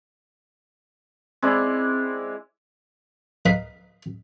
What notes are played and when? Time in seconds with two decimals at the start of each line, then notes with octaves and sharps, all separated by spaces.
1.43 G#3 C4 E4 D5
3.46 A#4 B4 D#5 F5 B5